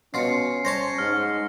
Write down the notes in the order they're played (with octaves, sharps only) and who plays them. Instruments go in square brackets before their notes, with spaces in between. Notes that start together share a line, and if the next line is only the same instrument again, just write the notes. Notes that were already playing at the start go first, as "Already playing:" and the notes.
[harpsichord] B2 F4 [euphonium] C#4 [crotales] C7 C#7
[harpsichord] C5 C#5 A5 [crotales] A#6
[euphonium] G#2 [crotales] F6